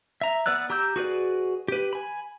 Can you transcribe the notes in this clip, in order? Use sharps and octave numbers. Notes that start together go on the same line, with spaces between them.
E5 A#5
B3 B4 D5 E6 F#6
G4 A#5 D6 E6 G6
F#4 G#4 B4 D5
G4 B4
G#5 B5